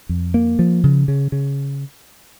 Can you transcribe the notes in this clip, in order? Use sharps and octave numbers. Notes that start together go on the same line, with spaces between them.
F2
A#3
F3
C#3
C#3
C#3